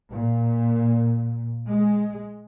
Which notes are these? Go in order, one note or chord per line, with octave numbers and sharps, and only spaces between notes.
A#2
G#3